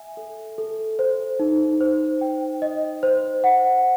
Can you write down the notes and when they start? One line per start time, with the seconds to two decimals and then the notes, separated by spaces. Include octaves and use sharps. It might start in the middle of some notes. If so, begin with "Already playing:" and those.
Already playing: E5 G#5
0.17 A4
0.58 A4
0.99 C5
1.39 D#4
1.81 C5
2.21 G5
2.62 D#5
3.03 C5
3.44 F#5